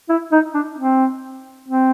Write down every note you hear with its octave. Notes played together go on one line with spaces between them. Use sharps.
E4
D#4
D4
C4
C4